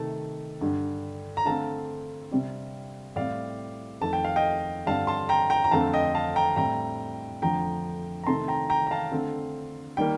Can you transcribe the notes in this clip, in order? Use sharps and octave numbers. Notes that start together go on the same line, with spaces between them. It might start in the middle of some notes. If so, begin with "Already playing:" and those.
Already playing: C3 D#3 A3 A5
G2 D3 G3
A#5
D3 A3 C4 F5 A5
C3 G3 C4
A2 G3 C4 D5 F5
F2 D#3 A3 A5
G5
F5
D#5 G5
G2 D3 G3 C4 F5 A5
A5 C6
G5 A#5
G5 A#5
A#5
F2 D3 A3 C4 F5 A5
D#5 G5
F5 A5
G5 A#5
A2 G3 C4 G5 A#5
F2 D3 F3 A3 G5 A#5
A#5
C3 D#3 A3 C4 A5 C6
G5 A#5
G5 A#5
A#5
F5 A5
D3 A3 C4
D#3 G3 A#3 G5